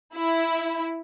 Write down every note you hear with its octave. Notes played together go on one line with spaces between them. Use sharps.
E4